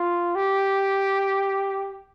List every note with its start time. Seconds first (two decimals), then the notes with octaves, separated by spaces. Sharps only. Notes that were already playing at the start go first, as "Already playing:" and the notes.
Already playing: F4
0.35 G4